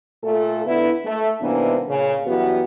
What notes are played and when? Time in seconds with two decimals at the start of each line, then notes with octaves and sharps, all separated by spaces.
0.23 A#2 A3 F4 A4
0.65 D3 B3 E4
1.05 A3
1.41 G#2 C3 E3 A#3 B3 D4
1.89 A#2 C#3
2.26 F#2 E3 G3 B3 F#4